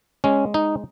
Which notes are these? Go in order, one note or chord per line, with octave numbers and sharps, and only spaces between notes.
G#3 C#4
D#4